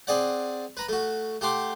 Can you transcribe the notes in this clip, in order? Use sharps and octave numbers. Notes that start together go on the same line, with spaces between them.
C4 G#4 D5 F#5
B4 A#5 B5
A3 F#4
A3 G4 F#5 C6 D6